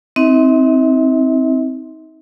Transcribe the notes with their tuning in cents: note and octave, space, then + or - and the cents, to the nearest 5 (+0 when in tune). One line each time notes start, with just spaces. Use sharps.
C4 +0 D#4 +30 E5 -40